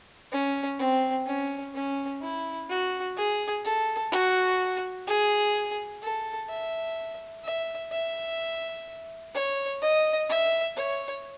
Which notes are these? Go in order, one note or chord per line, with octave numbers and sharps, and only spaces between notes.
C#4
C4
C#4
C#4
E4
F#4
G#4
A4
F#4
G#4
A4
E5
E5
E5
C#5
D#5
E5
C#5